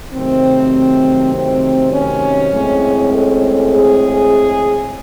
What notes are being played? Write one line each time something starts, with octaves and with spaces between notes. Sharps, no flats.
C3 D#3 F#3 A3 C4
C4
C#4
A2 G#3 C4
A4
G#4